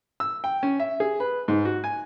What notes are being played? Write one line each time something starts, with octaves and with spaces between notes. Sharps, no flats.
E6
G5
C#4
E5
G#4
B4
G#2
F#4
G#5